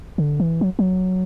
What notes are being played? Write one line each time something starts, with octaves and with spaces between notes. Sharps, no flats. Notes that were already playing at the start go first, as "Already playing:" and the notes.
D3
E3
F#3
F#3